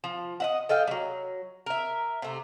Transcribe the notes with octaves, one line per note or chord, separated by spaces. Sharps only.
F3
D#5 E5 F#5
A4 D#5 F5 G5
F#3 G3
A#4 E5
C3 A3